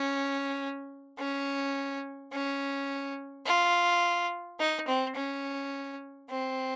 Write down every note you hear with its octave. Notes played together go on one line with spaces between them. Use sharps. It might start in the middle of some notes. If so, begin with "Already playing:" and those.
Already playing: C#4
C#4
C#4
F4
D#4
C4
C#4
C4